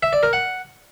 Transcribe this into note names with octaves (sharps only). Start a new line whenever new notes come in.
E5
D5
A#4
F#5